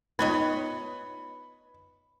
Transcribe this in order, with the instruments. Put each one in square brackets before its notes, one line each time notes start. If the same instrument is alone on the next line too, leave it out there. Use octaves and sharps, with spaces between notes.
[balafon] B3 D#4 F4 [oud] B4 C#5 D#5 [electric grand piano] B5